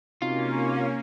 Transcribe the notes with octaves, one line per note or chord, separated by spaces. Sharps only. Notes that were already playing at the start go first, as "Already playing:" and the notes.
C3 A#3 C4 C#4 D#4 F4 F#4